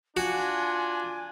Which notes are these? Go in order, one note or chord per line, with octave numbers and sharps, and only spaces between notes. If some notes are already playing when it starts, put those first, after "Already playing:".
D4 F4 F#4 G#5